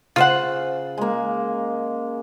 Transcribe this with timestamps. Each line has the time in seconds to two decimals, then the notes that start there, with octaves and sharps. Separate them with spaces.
0.16 C#3 F4 C5 F#5
0.98 G#3 A#3